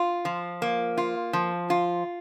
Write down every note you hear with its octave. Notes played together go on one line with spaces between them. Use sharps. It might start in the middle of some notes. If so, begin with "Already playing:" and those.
Already playing: F4
F3
A#3
F4
F3
F4